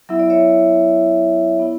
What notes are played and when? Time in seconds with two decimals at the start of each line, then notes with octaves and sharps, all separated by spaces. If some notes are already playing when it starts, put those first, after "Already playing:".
0.09 F#3 B3 E4 E5
0.20 D5
0.30 C#5 E5
1.60 B3 E4